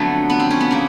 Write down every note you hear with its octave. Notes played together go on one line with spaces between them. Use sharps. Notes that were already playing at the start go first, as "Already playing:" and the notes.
Already playing: F2 D3 F#3 A3 B3
B3
C4
C#4
B3
C#3 A#3